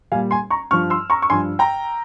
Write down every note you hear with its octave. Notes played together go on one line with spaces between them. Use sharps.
A#2 G3 F5 G#5
G#5 C6
A#5 C#6
G2 F3 C#6 F6
C6 E6
A#5 C#6
C#6
G2 F3 G#5 C6
G5 A#5